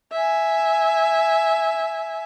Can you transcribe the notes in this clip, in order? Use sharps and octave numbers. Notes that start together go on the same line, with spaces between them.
E5 G#5